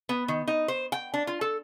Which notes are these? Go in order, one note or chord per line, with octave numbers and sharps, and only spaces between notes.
B3
D#3
D#4
C5
G5
D4
F4
A4